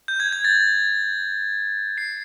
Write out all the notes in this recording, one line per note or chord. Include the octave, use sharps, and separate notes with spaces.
G6
G#6
G#6
A6
C7